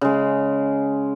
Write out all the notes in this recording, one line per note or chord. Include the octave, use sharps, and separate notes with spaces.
C#3 G#3